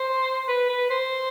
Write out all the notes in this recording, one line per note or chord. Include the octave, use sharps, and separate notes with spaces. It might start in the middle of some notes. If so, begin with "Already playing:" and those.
Already playing: C5
B4
B4
C5